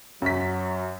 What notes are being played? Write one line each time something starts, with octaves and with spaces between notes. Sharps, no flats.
F#2 F#3 B6